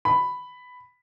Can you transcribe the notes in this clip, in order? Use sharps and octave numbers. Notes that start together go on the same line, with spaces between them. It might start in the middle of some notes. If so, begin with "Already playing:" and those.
B5